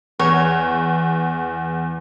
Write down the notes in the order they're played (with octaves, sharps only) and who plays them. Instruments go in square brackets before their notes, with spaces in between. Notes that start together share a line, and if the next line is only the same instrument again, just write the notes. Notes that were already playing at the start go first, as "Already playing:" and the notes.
[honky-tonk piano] E2 [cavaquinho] C#5